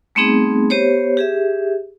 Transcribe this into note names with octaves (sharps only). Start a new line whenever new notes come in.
G3 A3 B3 C4 D#4 G#4
B3 G4 C5 C#5
G4 G#4 E5